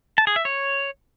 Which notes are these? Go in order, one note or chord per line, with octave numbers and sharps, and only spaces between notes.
A5
G#4
E5
C#5